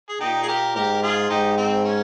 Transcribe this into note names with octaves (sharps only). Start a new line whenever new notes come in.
G#4
A#2 D#4 G4
G#4
G4 A#4
G#2 G4 A#4
A#4
F4 G#4
G#2 D#4 G4
C4
C#4